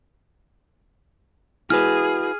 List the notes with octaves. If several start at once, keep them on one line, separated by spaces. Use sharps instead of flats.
E4 F#4 G#4 B4 F6